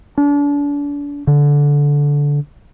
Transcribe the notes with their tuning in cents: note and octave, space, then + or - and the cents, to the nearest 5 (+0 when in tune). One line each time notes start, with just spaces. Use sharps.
D4 -35
D3 -15